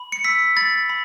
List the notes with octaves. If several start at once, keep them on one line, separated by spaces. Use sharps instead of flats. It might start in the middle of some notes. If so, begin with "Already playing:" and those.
Already playing: B5
C#7
E6 B6
B5 A6
B5